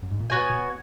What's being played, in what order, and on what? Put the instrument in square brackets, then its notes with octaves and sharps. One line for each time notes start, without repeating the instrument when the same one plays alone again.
[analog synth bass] F#2
G#2
A#2
[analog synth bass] B2 [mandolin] B3 F#4 C#5 G#5
[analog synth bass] B2